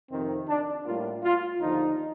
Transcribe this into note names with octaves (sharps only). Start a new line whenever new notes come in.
F2 C3 D#3 C4
D4
A2 G3 A#3 F4
F4
D#2 D3 F3 D#4